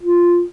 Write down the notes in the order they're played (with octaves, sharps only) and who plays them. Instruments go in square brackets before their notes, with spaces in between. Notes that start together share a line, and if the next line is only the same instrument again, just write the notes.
[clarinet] F4